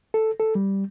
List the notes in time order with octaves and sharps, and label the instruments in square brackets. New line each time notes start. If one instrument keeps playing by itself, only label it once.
[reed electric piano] A4
A4
G3